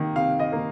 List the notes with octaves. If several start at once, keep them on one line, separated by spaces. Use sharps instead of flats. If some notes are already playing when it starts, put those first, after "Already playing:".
Already playing: C3 D#3 A#3
C3 F5
D#5
D#3 A#3